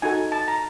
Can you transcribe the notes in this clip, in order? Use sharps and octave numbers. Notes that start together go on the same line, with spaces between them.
D#4 F#4 A4 G#5
A5
A#5